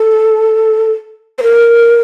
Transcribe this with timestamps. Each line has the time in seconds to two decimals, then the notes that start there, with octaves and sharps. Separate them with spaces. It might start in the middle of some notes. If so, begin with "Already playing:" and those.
Already playing: A4
1.39 C5
1.43 A#4